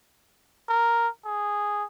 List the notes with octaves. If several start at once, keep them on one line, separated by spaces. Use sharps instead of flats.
A#4
G#4